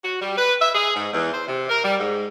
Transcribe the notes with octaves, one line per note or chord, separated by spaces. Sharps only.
F#4
G3
B4
E5
G#4
G#2
E2
C5
C3
A#4
G3
G#2